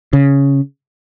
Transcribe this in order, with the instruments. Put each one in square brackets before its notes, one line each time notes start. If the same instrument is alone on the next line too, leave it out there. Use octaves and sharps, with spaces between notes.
[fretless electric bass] C#3